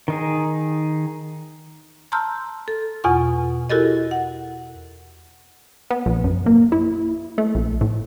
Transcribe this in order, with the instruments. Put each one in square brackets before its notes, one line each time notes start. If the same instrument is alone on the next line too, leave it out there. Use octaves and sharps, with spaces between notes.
[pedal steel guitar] D#3 D#4 G#4
[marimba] A5 A#5 C6 E6 F6 G6
A4
E2 B2 F4 F#5 C#6
E4 F#4 G4 A4 A#4 D#5
F#5
[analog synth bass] B3
A#1
F#2
A#3
E4
A3
A#1
A2